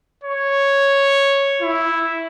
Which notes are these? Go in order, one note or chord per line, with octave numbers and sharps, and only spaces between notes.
C#5
E4